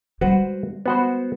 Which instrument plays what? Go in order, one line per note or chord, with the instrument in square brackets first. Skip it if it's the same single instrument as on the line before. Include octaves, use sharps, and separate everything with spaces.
[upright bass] G3 G#3 [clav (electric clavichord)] F#4 B4 C5
[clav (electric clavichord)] B3 F#4 C5